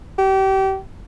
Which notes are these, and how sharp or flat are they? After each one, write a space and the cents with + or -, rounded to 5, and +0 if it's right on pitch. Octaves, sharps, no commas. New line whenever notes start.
G4 -30